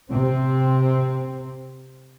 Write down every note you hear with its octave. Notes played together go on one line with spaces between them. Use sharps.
C3 C4